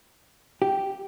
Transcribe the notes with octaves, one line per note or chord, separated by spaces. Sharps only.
G4